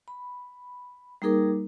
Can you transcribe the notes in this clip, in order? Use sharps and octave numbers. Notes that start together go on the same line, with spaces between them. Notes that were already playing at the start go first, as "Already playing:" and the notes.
B5
G3 A#3 D#4 G#4 A#4 D6